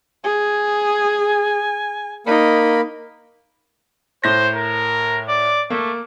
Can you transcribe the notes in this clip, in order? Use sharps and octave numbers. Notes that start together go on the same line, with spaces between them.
G#4 G#5
A#3 D#4 A#4 B5
A2 C5 G6 A#6
A#4
D5
A3 A#3